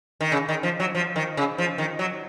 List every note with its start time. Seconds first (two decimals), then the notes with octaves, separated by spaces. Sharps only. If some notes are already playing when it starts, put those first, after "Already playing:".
0.21 D#3
0.32 C#3
0.49 D#3
0.63 F3
0.80 F#3
0.95 F3
1.16 D#3
1.37 C#3
1.58 F3
1.78 D#3
1.99 F#3